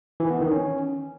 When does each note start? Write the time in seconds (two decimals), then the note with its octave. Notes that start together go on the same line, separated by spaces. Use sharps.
0.20 E3
0.30 B3
0.41 D#3
0.51 C#4